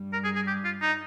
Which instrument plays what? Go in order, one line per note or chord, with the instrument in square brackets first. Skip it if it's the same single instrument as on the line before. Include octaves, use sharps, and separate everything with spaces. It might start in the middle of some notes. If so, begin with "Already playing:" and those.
Already playing: [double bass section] G2 G3
[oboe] A#4
G#4
G#4
G4
F4
D#4